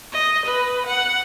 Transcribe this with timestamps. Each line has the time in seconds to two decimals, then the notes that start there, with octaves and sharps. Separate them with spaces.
0.13 D#5
0.46 B4
0.86 F#5